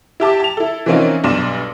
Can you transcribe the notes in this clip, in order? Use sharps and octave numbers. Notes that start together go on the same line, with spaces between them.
E4 G4 A5 D6
A5 F7
E4 A4
E3 F3 A#3 C4 C#4 D#4
B1 G2 D5 C6 E7